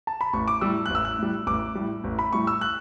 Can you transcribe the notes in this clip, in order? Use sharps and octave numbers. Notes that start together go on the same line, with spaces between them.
A5
B5
A1 C#6
D6
A2 G3 E6
A1 F#6
E6
F#6
A2 G3
A1 D6
A2 G3
A1
B5
A2 G3 C#6
E6
F#6